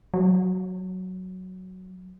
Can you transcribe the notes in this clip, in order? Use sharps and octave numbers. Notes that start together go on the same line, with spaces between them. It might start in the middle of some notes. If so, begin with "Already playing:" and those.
F#3